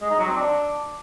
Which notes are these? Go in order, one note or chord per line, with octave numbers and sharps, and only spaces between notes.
G#3
D#4
F#3
C4
D4